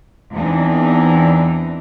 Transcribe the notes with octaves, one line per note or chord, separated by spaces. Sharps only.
E2 E3 C4 D4 D#4